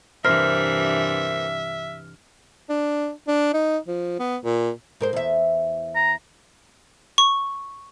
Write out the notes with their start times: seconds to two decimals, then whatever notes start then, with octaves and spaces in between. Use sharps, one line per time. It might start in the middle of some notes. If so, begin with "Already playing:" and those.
0.25 G2 C3 E3 A#4 C5 E5 F6
2.70 D4
3.27 D4
3.54 D#4
3.88 F3
4.19 B3
4.44 A#2
5.00 G#2 A#4 C5
5.13 E2 E5
5.95 A#5
7.18 C#6